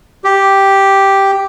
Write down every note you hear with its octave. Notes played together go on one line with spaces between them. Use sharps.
G4